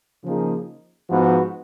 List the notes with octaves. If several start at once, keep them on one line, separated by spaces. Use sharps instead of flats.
C#3 F3 A#3 D#4 G#4
G#2 F3 B3 F#4 B4